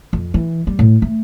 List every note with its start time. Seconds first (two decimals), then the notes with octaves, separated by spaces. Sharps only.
0.13 F2
0.34 E3
0.67 G3
0.79 A2
1.02 A3